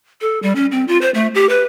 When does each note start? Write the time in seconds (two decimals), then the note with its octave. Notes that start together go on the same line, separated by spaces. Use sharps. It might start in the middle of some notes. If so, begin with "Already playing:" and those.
0.21 A4
0.43 G3
0.56 C#4
0.72 C4
0.88 F4
1.01 C5
1.14 A3
1.35 G4
1.49 B4